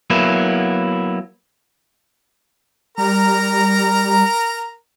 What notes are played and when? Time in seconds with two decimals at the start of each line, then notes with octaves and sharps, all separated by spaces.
0.10 F#3 A#3 B3 E4
2.98 G3 A#4 A#5